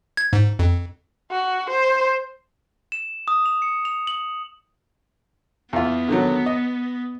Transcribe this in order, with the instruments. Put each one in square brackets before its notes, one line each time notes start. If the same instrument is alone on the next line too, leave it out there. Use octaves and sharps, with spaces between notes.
[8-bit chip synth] G#6
G#2
F2
[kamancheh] F#4
C5
[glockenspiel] E7
D#6
F7
C#7
F7
F#7
[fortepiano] E2 F4 [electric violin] B3
[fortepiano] D3 D#3 F#3
D#5